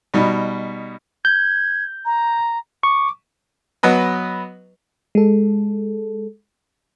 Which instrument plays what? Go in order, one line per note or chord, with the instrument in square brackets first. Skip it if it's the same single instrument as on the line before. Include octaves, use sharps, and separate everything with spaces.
[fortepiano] B2 G3 D#4
[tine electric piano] G6 [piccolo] G#6
[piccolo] A#5
[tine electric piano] C#6 [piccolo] D6
[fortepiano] F#3 B3 B4 D#5
[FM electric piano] G#3 A4